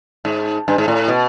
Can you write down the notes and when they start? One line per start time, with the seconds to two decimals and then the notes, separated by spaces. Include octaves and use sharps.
0.25 G#2
0.68 G2
0.78 G#2
0.88 A2
1.08 B2